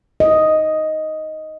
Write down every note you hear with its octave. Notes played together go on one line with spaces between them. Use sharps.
D#5